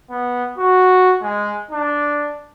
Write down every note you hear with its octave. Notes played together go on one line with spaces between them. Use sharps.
B3
F#4
G#3
D4